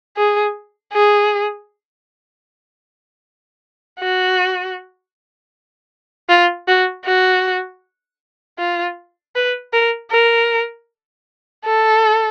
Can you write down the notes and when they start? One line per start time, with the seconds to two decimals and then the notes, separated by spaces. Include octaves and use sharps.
0.17 G#4
0.93 G#4
4.00 F#4
6.29 F4
6.68 F#4
7.05 F#4
8.58 F4
9.36 B4
9.73 A#4
10.11 A#4
11.65 A4